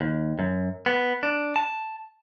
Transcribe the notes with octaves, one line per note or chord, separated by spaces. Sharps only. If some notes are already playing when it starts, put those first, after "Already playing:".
D#2
F#2
B3
D4
A5